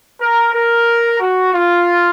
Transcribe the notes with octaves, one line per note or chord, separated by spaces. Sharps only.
A#4
A#4
F#4
F4